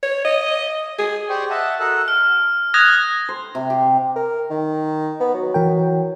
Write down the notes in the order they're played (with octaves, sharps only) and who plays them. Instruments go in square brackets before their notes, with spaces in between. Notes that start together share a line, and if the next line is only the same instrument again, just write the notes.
[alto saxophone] C#5
D#5
G#4
[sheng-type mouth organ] G4 C5 D5 G5 C#6 D#6
D#5 E5 F#5 A5
F#4 A4 A#4 D#5 E6 F#6
[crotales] F6
D#6 F#6 G#6 A#6
[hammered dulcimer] C5
C3
G4
[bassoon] A#4
D#3
B3
F#3
[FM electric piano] E3 A#4 G5